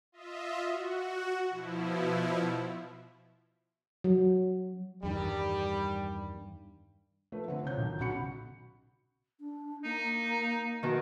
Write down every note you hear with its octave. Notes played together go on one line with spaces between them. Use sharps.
F4 D#5 E5
F#4
B2 F3 E4
F#3
E2 G2 D#3 G3
F3 A3 B4
D3 C4
C2 F4 C#5 G6
B1 D#3
B1 C#3 F#4 B5 C#7
D4
A#3 D#4
B2 D#3